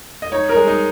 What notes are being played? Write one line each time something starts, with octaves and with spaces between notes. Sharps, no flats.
D#5
D#4 C#5
A#4
G#3
D#4